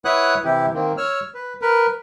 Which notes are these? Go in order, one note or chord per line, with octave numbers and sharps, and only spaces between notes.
E4 B4 C#5 F#5 D#6 F#6
C3 E3 E4 G4
D#3 A#3 C4
C#5 E6 F6
B4
A#4 B4